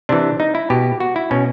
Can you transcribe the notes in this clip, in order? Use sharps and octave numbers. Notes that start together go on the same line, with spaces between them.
C3 E3 D4
D#4
E4
B2 G4
F#4
E4
B2 C#4